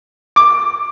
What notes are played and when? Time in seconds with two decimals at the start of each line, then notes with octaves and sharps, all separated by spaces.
0.36 D6